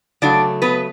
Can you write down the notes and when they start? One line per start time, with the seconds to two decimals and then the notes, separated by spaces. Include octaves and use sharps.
0.22 C#3 F#3 A3 D4 D5
0.62 B3 B4